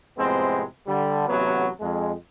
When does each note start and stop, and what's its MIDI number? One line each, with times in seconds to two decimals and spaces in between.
0.18 0.63 41
0.18 0.63 45
0.18 0.63 48
0.18 0.63 56
0.18 0.63 59
0.18 0.63 60
0.87 1.27 50
0.87 1.27 55
1.28 1.67 33
1.28 1.67 48
1.28 1.67 54
1.28 1.67 59
1.80 2.12 41
1.80 2.12 56